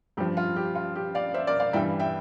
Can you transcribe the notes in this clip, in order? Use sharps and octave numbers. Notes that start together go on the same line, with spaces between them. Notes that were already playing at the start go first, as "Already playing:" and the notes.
G2 F3 G4
F4
G4
F4
G4
D5 F5
C5 E5
A#4 D5
D5 F5
G2 E3 G3 E5 G5
E5 G5